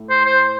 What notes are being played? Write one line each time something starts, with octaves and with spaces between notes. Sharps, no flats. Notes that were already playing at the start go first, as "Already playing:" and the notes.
Already playing: A2 A3
C5
C5